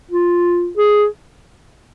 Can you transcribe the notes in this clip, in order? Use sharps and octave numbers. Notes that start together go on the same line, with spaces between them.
F4
G#4